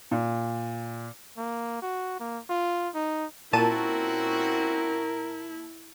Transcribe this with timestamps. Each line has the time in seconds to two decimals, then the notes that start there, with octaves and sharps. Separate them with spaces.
0.11 A#2
1.37 A#3
1.82 F#4
2.20 A#3
2.50 F4
2.95 D#4
3.53 A#2 C4 C#4 E4 F#4 A#4 A5 D#7